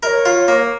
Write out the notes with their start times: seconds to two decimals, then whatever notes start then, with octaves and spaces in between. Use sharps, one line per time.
0.03 A#4 E5
0.07 C#5
0.25 F4
0.48 A#3